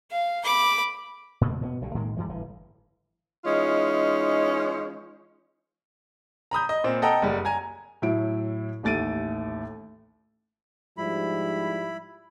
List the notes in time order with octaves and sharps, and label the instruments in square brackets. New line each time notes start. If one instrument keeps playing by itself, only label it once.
[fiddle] F5
B5 D6
[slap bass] G#2 B2 D3 A#3
B2 G#3 B3
B1 A#2 D3 G3
A2 D#3 G#3 A#3
G2 E3 G3 G#3
G1 A2 E3
[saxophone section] E3 G#3 C#4 D#4 F4
[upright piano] A#5 B5 D#6 G6
D#5
A#2 C4
A4 D#5 F#5 G5 A#5
F#1 G3
G#5 A#5 G#6
[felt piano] A2 F#3 E4 D7
A1 D#2 A3 A6 D7 D#7
[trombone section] G#2 F3 G3 [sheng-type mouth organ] E4 B5